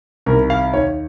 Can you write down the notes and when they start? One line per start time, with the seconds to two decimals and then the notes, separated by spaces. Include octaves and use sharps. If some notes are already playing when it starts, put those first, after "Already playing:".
0.26 C2 C3 D#3 A#4
0.50 F5
0.73 D#3 C#5
0.77 D#2